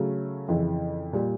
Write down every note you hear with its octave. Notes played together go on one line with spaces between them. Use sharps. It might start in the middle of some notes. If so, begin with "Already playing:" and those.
Already playing: C#3 F#3 A3 C#4
F2 C#3 E3
A#2 G3